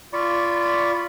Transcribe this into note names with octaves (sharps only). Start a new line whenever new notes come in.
F4 D5 B5 C#6